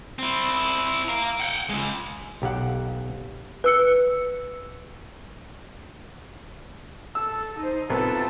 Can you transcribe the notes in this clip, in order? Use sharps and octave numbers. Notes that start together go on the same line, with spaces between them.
C4 E4
F5 A#5
F#5 G5
C#3 G#3
B1 G4 F5 F#5
B4 E6 C#7
A4 E6
D#4 C5
C2 B3 F4 A4